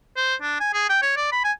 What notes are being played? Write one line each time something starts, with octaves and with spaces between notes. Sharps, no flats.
C5
D4
G#5
G#4
G5
C#5
D5
B5
G#5